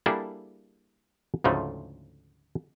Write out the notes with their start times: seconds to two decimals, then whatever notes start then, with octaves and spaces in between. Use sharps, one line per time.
0.06 G3 A#3 D4 E4 G#4 A4
1.44 D2 G#2 C#3 F3 A3